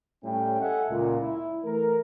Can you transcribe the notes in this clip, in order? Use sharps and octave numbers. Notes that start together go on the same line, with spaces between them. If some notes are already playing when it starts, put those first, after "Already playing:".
A2 G3 C#4 G5
A4 D#5 E5 F#5 G#5
C#2 A#2
E4
E3 A3 A#4